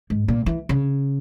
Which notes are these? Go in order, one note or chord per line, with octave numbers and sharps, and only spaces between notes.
G#2
A#2
E3
C#3